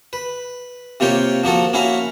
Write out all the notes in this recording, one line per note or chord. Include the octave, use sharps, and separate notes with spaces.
B4
C3 A#3 F4 G4 C#5 G5
F3 A#3 F#4 A4
A#3 C#4 E4 F#4 F5